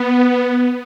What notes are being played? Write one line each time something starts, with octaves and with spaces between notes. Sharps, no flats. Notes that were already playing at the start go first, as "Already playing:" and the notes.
Already playing: B3